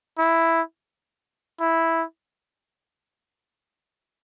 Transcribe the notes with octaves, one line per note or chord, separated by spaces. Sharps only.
E4
E4